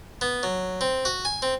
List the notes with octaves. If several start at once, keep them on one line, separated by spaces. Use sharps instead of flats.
B3
F#3
C4
F#4
G#5
C4